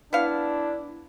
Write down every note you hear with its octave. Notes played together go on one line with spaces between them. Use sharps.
B3 D4 E4 F5